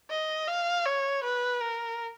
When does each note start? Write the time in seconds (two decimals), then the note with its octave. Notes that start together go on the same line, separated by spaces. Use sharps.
0.11 D#5
0.48 F5
0.86 C#5
1.24 B4
1.62 A#4